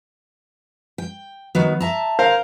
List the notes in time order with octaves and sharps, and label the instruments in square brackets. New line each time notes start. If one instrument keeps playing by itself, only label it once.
[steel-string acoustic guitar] G5
D#3 F#3 B3
E5 A5 A#5
[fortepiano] A#4 C5 F5